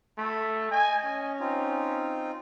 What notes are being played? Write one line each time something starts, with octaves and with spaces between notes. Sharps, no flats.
A3 B5
D#5 G#5
C#4
C4 D#4 F4